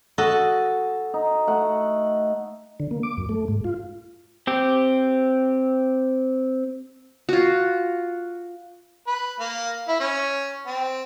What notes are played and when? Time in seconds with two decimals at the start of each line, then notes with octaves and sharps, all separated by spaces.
0.18 F#4 A4 D#5
1.14 D#4
1.47 A3 F#5
2.80 D3
2.91 A#3
3.03 D6
3.17 F#2
3.29 A3
3.48 G#2
3.64 F4
4.47 C4 G4
7.29 F4 F#4
9.07 B4
9.40 A#3
9.88 E4
10.00 C#4
10.67 C4